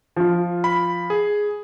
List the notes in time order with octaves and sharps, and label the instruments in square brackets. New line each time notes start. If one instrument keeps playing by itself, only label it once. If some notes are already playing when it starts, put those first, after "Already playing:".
[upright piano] F3 F4
[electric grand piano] B5
G#4